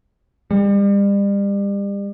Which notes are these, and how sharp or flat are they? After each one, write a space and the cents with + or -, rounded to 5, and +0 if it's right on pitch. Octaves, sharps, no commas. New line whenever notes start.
G3 +35